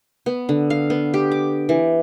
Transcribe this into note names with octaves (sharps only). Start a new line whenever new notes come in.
B3
D3
F5
B3
G4
D6
E3